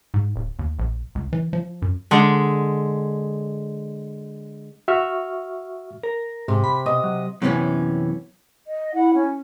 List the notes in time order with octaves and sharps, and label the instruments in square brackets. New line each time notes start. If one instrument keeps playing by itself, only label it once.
[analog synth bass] G#2
D1
D#2
A#1
C#2
E3
F3
F#2
[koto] D3 G#3
[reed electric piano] F#4 E5 C#6 F6
[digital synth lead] A#4
[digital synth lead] G#2 [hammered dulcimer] C3
[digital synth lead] B5
[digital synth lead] B2 [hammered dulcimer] D#5
[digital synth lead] F#3
[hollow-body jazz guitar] F#2 C3 E3 B3 C#4
[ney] D#5
[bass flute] E4 [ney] F#5
[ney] C#4